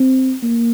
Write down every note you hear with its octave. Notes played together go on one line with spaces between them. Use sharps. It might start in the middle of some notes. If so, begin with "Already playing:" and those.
Already playing: C4
A#3